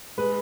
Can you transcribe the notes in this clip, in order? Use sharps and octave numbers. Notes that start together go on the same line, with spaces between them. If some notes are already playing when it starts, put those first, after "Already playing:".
G#3 B4